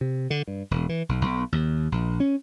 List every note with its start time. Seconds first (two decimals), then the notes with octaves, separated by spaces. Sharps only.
0.01 C3
0.30 D3
0.48 G2
0.71 E1
0.89 E3
1.09 B1
1.22 B1
1.52 D#2
1.92 A#1
2.20 C#4